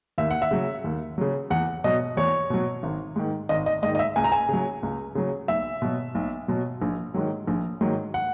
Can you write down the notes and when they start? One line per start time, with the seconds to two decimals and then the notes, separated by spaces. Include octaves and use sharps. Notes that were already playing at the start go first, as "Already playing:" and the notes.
0.18 D#2 E5
0.31 F#5
0.42 E5
0.51 C#3 F#3
0.84 D#2
1.18 C#3 F#3
1.50 E2 F#5
1.84 B2 F#3 D#5
2.17 E2 C#5
2.50 B2 F#3
2.83 G#1
3.16 G#2 D#3
3.49 G#1 D#5
3.66 D#5
3.82 G#2 D#5
3.86 D#3
3.95 D#5
3.99 E5
4.16 C#2 G#5
4.24 A#5
4.32 G#5
4.49 C#3 F#3
4.83 C#2
5.15 C#3 F#3
5.48 B1 E5
5.82 B2 F#3
6.15 B1
6.48 B2 F#3
6.82 A#1
7.14 G#2 D#3 F#3
7.47 A#1
7.81 G#2 D#3 F#3
8.14 F#5